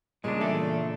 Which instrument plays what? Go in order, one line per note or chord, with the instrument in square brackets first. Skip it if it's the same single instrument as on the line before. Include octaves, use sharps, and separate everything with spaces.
[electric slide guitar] A#2 C#3 D4 [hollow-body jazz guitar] G3 [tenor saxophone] G#3
[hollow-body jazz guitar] E2 A4 [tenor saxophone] A3